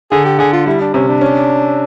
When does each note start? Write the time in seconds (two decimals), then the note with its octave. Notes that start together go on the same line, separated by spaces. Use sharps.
0.11 D3 G#4
0.25 G4
0.39 D3 G#4
0.53 F4
0.66 G3 E4
0.81 D4
0.94 C3 C#4
1.08 D4
1.21 C#4